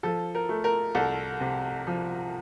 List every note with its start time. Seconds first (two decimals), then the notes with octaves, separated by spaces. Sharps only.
0.03 F3 A4
0.35 A#4
0.49 A3
0.64 A#4
0.95 C2 A4
1.40 C3
1.87 F3